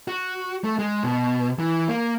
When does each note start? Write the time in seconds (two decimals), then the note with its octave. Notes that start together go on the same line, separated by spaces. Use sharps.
0.08 F#4
0.64 A3
0.79 G#3
1.04 B2
1.59 E3
1.89 A#3